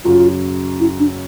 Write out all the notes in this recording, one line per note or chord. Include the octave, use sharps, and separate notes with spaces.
F#2 C#3 F#3 F4
E4
D4